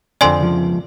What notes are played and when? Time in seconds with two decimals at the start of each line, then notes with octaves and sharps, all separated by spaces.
0.21 F2 D3 C4 D5 G#5 C6
0.40 C#2 F3